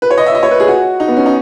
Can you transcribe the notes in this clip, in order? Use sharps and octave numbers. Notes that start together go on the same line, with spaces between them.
B4
C#5
D#5
E5
D#5
C#5
B4
G#4
F#4
D#4
B3
C#4
D#4